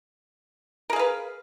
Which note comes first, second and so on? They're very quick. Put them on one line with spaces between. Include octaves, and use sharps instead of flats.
A#4 G#4 F5 B4